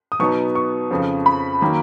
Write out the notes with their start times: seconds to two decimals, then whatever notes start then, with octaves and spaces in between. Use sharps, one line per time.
0.12 D#6
0.19 B2 F#3 B3 D#4 C#6
0.55 C#6
0.91 F2 C#3 F3
1.26 B5
1.62 D#3 F#3 A#3